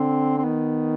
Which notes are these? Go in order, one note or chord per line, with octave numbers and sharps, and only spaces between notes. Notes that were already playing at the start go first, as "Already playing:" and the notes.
Already playing: D3 C4
C4
D#3 B3